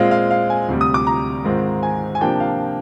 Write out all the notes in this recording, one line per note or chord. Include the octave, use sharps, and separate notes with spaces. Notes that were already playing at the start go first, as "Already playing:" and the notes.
Already playing: A#2 G#3 C4 F4 F5
F5
F5
G#5
D2 C3 G3
D#6
D6
A#5
G#2 D#3 G#3 C4 F4
G#5
G#5
C3 F3 A#3 D4 G5
F5